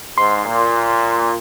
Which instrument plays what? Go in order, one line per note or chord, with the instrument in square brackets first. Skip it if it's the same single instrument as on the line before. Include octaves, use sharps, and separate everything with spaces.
[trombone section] G#2 [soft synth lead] C6
[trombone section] A#2